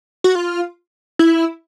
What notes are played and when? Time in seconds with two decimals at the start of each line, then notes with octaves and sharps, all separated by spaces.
0.24 F#4
0.35 F4
1.19 E4